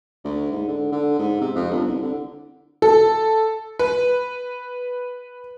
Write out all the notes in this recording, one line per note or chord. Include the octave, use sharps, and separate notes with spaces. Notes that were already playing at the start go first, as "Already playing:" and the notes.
D2
G#2
D3
D3
G#2
C3
F2
G1
C2
D3
A4
B4